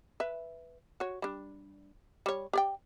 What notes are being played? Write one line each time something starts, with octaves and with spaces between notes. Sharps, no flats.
B4 E5
F#4 C#5
G3 D4
G3 C#5
G4 D5 G5